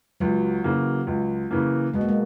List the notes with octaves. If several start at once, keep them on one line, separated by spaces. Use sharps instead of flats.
C#2 F#3
C#3 E3 A#3
C#2
C#3 E3 A#3
B2 G#3
A#3
G#3